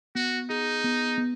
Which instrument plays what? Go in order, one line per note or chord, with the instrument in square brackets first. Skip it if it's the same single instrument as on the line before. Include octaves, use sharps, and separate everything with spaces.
[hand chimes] B3 [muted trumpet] F#4
[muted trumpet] D#4 [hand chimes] G#4
[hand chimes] B3
B3